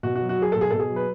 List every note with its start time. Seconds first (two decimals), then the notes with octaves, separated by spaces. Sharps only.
0.03 B2 F#4
0.15 F#4
0.21 F#3
0.29 F#4
0.38 F#3 G#4
0.52 B2 A4
0.61 G#4
0.70 B2 A4
0.80 G#4
0.89 F#3
0.96 B4